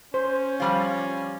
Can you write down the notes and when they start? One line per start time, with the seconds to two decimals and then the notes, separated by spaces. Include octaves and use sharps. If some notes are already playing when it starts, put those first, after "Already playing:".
0.14 C#4 C5
0.60 F3 G3 F4